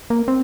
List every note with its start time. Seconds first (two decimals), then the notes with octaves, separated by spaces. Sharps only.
0.10 A#3
0.28 C4